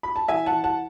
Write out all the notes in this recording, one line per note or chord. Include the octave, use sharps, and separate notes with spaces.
B5
A5
E3 E5 G#5
F#5 A5
E3
F#5 A5